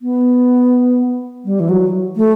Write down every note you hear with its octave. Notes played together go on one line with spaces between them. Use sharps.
B3
G3
E3
F#3
A3